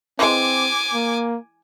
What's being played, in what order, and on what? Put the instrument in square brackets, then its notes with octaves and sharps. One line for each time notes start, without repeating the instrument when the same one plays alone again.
[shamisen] E3 G#3 [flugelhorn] C4 [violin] G#5 D6
[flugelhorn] A#3